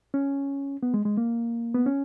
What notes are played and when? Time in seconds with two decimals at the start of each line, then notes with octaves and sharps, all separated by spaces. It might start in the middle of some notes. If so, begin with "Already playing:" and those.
0.14 C#4
0.83 B3
0.94 G#3
1.05 G#3
1.17 A#3
1.75 B3
1.86 C#4